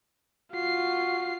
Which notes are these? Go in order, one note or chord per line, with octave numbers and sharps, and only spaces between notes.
F4 F#4 C7